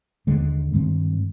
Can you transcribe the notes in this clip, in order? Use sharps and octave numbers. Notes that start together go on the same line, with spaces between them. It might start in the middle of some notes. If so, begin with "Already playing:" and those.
D#2 D3 G#3
G2 D#3 G#3 C4